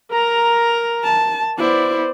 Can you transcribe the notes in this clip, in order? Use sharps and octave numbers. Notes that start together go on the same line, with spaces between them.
A#4 A#5
A5
B3 E4 C5 D5